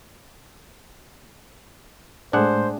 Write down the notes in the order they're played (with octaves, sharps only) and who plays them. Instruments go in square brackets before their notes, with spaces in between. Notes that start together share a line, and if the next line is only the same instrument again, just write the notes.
[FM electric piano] A2 G#3 A3 [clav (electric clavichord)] D4 G#4 F#5 [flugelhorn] C5